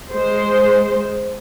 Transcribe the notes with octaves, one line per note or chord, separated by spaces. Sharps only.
G#3 C5